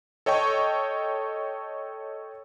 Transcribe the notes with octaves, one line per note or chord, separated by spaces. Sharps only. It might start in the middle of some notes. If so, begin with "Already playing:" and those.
A4 C#5 D#5 G5 C#6